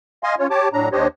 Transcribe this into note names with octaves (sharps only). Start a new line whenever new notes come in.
D#5 F5 G#5 C6
C#4 F4 C#5
G4 C#5 A5 D6
A2 F#3 D4 A#5
D#2 D4 G4 C5 C#5 D#5